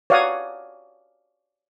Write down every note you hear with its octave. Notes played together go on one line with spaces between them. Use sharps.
C#5 D5 F5 F#5 A#5 D#6